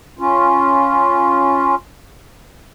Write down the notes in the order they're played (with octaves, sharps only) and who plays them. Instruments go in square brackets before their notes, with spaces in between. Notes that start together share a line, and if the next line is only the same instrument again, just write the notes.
[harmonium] C#4 F4